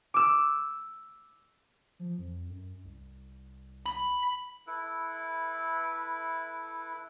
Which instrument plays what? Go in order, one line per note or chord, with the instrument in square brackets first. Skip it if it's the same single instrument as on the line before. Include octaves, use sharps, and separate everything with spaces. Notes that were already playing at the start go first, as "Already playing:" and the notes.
[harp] D6 E6
[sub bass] F3
F2
F#2
C2
[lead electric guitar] B5
[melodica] E4 A4 B4